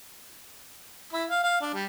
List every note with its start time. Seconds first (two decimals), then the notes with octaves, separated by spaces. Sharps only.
1.13 E4
1.30 F5
1.43 F5
1.61 D4
1.74 G3